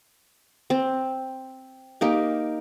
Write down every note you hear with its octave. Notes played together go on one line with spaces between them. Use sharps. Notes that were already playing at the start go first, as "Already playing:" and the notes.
C4
A#3 D#4 G4